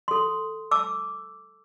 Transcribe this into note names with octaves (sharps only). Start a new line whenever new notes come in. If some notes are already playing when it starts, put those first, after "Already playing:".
A4 C6
A5 D6 E6